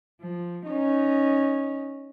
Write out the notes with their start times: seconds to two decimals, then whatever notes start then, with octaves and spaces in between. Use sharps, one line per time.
0.21 F3
0.66 C#4 D#4